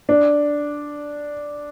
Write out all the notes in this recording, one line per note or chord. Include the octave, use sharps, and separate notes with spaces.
D4